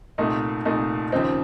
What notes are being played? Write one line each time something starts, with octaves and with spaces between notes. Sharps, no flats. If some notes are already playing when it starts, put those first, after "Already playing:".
C2 A#2 A3 D#4
C2 A#2 A3 D#4
D#2 C#3 F3 C4 D#4